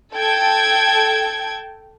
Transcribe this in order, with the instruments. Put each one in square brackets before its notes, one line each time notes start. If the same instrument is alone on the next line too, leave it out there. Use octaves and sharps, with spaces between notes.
[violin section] A4 G5 G#6